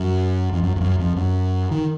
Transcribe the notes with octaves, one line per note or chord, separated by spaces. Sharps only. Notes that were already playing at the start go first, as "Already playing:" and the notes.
Already playing: F#2
F2
F#2
F2
F#2
F2
F#2
D#3